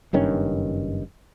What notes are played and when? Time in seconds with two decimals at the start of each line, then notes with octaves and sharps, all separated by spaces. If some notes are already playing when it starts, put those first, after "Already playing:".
0.13 F#1 G2 D#3 C#4